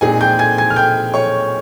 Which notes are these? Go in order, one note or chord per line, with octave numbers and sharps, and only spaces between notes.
A#2 G#3 C4 D#4 G#4 G#5
G5 G6
G#5 G#6
G#5 G#6
F6
G5 G6
C#5 C#6